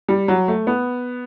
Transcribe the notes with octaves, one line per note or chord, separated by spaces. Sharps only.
G3
F#3
A3
B3